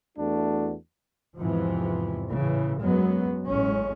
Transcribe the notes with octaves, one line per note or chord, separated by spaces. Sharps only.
E2 A3 D4 F#4
E2 G#2 C3 E3 F3
A2 C#3 E3
F#2 F#3 G#3 B3
A1 G#3 C#4